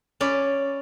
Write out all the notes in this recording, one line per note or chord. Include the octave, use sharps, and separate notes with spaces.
C#4 D5 B5